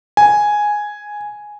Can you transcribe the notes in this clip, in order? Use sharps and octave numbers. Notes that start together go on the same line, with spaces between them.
G#5